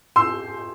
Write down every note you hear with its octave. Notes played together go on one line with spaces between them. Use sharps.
C6 E6